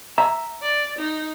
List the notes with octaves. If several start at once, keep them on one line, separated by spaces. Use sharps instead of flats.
E5 A#5
D5
D#4